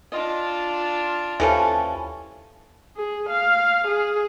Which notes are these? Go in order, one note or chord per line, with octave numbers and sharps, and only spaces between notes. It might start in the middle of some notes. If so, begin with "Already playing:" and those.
D4 F4 D#5
D#2 E3 F3 C#4 G4 A4
G#4
F5
G#4